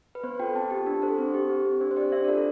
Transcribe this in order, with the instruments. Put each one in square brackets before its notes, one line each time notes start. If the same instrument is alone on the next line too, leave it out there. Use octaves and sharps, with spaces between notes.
[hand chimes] B4
B3 C5
F4 A4 G5
C4 A5
G4
D4
A4 C5
C4 C5
G4
C4
G4
D4 C5
C5
G4 D5
D4 E5
F4 A4 D5